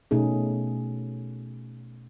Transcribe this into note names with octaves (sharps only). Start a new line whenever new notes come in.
B2 A3 C#4 D#4 G#4